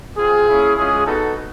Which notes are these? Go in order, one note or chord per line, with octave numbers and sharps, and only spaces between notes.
C4 F4 G#4
A#3 C#4 E4
G#3 C#4 F4 G#4
B3 D#4 F#4 A4